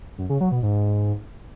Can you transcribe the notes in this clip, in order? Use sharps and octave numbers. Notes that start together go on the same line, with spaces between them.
F#2
C#3
F#3
B2
G#2